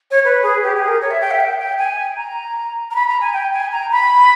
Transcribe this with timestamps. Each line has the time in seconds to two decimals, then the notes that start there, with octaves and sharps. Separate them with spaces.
0.11 C#5
0.25 B4
0.43 G#4
0.63 G4
0.76 G#4
0.88 A#4
1.01 C#5
1.11 E5
1.21 G5
1.31 E5
1.40 G5
1.59 G5
1.78 G#5
2.17 A#5
2.91 A#5
2.95 B5
3.08 A#5
3.21 G#5
3.33 G5
3.53 G#5
3.72 A#5
3.92 B5